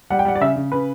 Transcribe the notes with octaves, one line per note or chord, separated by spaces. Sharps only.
G3 F#5
G5
G3 F#5
D5
C#3 E5
C#3
C#3 B4